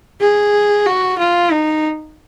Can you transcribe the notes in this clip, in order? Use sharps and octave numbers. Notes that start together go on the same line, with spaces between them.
G#4
F#4
F4
D#4